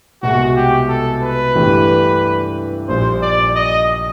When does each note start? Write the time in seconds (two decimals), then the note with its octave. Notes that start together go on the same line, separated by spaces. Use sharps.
0.22 C2 B2 G#3 F#4
0.56 G4
0.89 A4
1.23 B4
1.55 G2 E3 A3 D4 G4
2.89 A#1 A#2 G3 C5
3.22 D5
3.56 D#5